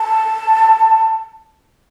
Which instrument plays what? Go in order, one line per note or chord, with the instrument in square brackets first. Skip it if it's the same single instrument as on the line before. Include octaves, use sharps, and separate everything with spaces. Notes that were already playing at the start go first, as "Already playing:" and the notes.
Already playing: [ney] A5